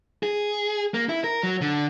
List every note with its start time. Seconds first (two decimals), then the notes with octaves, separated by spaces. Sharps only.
0.23 G#4
0.94 A#3
1.09 E4
1.24 A#4
1.43 F#3
1.61 D3